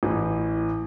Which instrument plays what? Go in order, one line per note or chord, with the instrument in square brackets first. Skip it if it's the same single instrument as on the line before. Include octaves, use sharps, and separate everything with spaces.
[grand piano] A1 E3